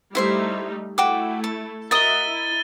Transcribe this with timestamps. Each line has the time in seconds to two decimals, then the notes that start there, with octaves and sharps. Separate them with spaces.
0.15 G3 A3 D#4 E4 C5 E5
0.98 A3 E4 F#4 G5 D6
1.44 A4
1.91 F#4 A#4 D#5 E5 D#6 A6 D#7 G7
2.29 E4